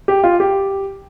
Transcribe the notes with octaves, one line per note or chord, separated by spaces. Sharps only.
G4
F4
G4